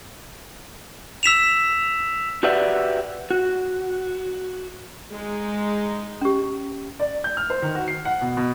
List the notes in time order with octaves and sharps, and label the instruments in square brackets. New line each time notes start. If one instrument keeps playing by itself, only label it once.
[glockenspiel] E6 B6 E7 F7
[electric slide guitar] F#4 G4 B4 D5 E5 F#5
F#4
[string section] G#3 D#4
[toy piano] C#4 G4
[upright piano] D5
G6
F6
C5
D#3
F#4
C7
F#5
B2
B2